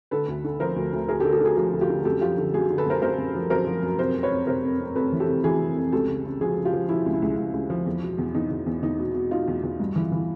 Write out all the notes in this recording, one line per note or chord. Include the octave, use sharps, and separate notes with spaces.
D3 A4 B4
D2
D3
F3 A#4 C5
D2
D2
D2 G#4 A#4
G4 A4
D3
G4 A4
D3 F#4 G#4
F3 F#4 G#4
D2
F4 G4
D3
F#2 G4 A4
F3 F4 G4
D3
F#2 F#4 G#4
D3
A4 B4
F#2 A#4 C5
F#2 A#4 C5
F#2
F3
F#2 A#4 C5
F3
F#2
C3 A#4 C5
F2
B4 C#5
F2
C3 A#4 C5
F2
F2
F2 A4 B4
E3
G4 A4
C3
E3 F#4 G#4
C3
F2
C#2 G4 A4
C#3
C#3
F3 F#4 G#4
C#3
F4 G4
F3
F3 E4 F#4
C#2
E4
C#2
C#2
C#2
F3
E2
B2
E2
E2 D#4
E2
E2
E2 D#4
B2
B2
B2 D#4 F4
E2
E2
G2
E3
E3